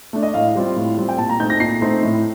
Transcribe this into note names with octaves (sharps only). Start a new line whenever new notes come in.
A3 D4
D#5
A2 F5
G3 C4 F4
A2
G3 C4 F4
G5
A#2 A5
A#5
A3 C4 D#4 G6
A#6
A#2 C7
A3 C4 D#4
A2